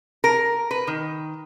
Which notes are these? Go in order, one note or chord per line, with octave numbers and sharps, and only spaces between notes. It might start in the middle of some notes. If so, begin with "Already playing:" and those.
A#4
B4
D#3